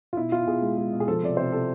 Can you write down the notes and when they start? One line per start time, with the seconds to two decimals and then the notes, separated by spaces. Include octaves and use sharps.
0.13 F4
0.17 B2 E4
0.32 B2 F4
0.47 B2 G#4
0.62 G#3
0.77 G#3
0.93 B2
1.00 G#4
1.08 F3 A4
1.23 C3 D5
1.37 C3 C5
1.52 C3 A4